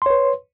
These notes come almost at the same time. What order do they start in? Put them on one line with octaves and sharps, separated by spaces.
C6 C#5 B4